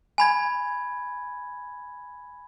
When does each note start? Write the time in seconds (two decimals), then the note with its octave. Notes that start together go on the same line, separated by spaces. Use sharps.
0.18 G#5 B5 G#6